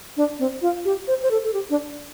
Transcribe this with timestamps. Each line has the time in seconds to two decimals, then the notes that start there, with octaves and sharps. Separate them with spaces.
0.17 D4
0.39 C4
0.62 F4
0.85 G4
1.08 C5
1.23 C5
1.31 A4
1.44 A4
1.54 G4
1.70 D4